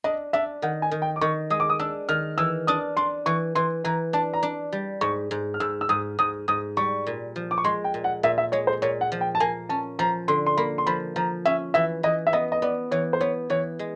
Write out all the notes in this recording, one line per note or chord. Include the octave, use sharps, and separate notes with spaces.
D4 D#5
D4 E5
D#3 F#5
G#5
D#3
G5
D6
D#3 C#6
G#3 D#6
D6
D#6
D4 E6
D#3 F6
E3 E6
D4 D#6
D4 C6
E3 C#6
E3 C6
E3 A#5
D4 A5
A#5
D4
G3
G#2 C#6
G#2
F6
G#2 E6
E6
G#2 D#6
G#2 D#6
G#2 D#6
G3 C#6
A#2
F3
D6
C#6
G#3 C6
G5
A#2
F#5
A#2 E5
E5
G#3 C#5
C5
A#2 C#5
F#5
F3
G5
A5
A#3 G#5
C#4 A5
F3 A#5
D3 C6
C6
A#3 B5
C6
F3 B5
F3 A#5
C#4 E5
E3 E5
E3 D#5
E5
B3 D#5
D#5
B3 D5
E3 C#5
C5
B3 C#5
E3 C#5
G#3